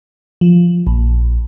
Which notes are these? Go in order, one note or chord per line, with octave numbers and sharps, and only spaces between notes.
F3
A#1